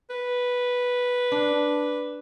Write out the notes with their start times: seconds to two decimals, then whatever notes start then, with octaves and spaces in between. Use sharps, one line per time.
0.10 B4
1.32 D4